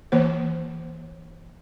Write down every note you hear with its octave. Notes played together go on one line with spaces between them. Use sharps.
E3 A#3 C5